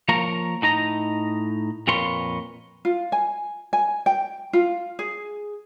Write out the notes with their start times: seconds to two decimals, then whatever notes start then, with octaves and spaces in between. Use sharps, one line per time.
0.09 F3 A#3 A#4 C#5 A#5
0.62 A2 D#4 D#5 A#5
1.87 F2 A#2 A#4 B4 C#5 C6
2.85 F4
3.12 G#5
3.73 G#5
4.06 G5
4.53 F4
4.99 G#4